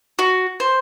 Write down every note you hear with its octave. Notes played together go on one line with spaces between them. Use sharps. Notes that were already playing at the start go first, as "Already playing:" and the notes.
F#4
C5